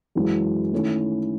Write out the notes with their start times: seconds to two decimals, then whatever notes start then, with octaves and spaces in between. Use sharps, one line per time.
0.15 F#2 E3 G#3
0.72 D#3 A3 C#4 E4